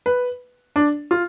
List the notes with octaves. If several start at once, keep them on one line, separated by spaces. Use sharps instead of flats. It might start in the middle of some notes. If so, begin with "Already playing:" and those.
B4
D4
F4